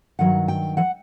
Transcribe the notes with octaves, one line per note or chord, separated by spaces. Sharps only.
G2 D#3 F#3 F#5
G5
E3 F#5